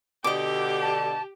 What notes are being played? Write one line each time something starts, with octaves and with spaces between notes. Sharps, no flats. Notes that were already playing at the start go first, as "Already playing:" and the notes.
B2 D3 G4 D#5 D6
A5